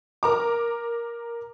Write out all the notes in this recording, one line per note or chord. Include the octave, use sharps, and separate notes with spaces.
A#4 A#5 D6